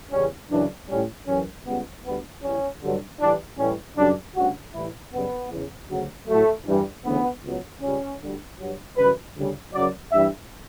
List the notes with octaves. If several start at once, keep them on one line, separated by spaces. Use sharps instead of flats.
E2 C#3 G3 C#4
F#2 C#3 E3 D4
A2 G3 C#4
F#2 E3 G3 C#4
C#2 C#3 G3 B3
D2 D3 G3 B3
E2 C#3 E3 G3 C#4
G2 D3 F#3
A2 E3 G3 D4
A2 E3 G3 C#4
F#2 C#3 G3 D4
D2 C#3 G3 F#4
A2 E3 G3 E4
F#2 C#3 G3 B3
E2 C#3 E3
D2 C#3 F#3
A2 F#3 A3
G2 E3 G3
D2 C#3 E3 B3
C#2 B2 F#3
C#2 C#3 G3 C#4
D2 D3 G3
G2 F#3
F#2 C#3 E3 G3 B4
D2 C#3 G3
F#2 C#3 F#3 D5
G2 E3 G3 E5